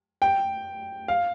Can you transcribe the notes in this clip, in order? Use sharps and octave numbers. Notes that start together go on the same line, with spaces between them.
G5
F5